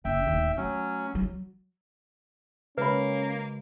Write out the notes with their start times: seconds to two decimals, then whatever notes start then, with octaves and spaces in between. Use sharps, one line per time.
0.05 F#1 E5 G5
0.27 D1 D#2
0.57 F#3 A3 C#4
1.15 F#3
2.78 C#3 G#3 A#3 C#4 F#4 B4 B5